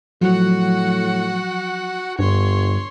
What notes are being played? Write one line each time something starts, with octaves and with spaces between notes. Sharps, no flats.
A2 F3 F#3 F#4 F#5
G1 G2 C#5 C6